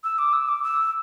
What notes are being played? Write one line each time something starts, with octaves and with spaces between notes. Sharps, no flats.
E6
D6
E6
D6
E6